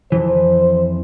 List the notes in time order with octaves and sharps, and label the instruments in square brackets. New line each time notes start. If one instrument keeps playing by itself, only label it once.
[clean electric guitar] F2 E3 [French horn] C5